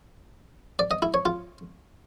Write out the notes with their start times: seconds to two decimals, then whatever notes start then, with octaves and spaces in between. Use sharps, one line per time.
0.79 D5
0.91 D#5
1.02 E4
1.14 C#5
1.25 F4